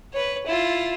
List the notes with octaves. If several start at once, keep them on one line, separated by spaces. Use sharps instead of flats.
B4 C#5
E4 F4